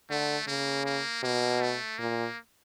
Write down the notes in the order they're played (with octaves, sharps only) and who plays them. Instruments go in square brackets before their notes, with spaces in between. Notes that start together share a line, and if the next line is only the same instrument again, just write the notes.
[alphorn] D3 [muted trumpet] A3
[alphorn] C#3 [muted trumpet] A#3
[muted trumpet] A#3
[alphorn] B2 [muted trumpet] A#3
[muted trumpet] A3
[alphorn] A#2 [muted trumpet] A#3